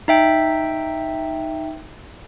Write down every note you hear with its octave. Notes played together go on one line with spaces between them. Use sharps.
D#4 E5 G5